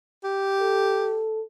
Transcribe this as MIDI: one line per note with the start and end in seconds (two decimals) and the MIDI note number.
0.24 1.23 67
0.60 1.42 69